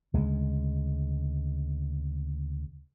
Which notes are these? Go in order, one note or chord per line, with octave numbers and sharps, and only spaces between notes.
D2 C#3 G#3